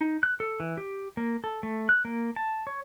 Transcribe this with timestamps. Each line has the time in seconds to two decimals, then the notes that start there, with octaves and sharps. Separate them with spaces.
0.01 D#4
0.23 F#6
0.40 A4
0.60 E3
0.77 G4
1.17 A#3
1.44 A4
1.63 A3
1.89 F#6
2.05 A#3
2.36 A5
2.67 C#5